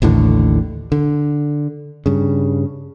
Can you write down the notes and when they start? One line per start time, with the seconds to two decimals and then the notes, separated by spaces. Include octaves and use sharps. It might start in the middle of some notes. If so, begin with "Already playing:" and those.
0.02 A1 D#2 A2 D3
0.92 D3
2.06 G2 C#3